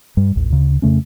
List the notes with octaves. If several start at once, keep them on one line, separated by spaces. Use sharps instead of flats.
G2 G3
A1 D#2
D2 C#3
F2 C#3 A3 C#4